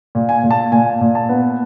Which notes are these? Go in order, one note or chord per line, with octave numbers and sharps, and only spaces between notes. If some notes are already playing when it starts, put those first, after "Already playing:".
A#2
G#5
A#2
A5
A#2 G#5
A#2
A5
B3